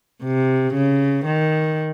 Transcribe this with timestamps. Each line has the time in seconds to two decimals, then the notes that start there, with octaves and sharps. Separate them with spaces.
0.23 C3
0.75 C#3
1.26 D#3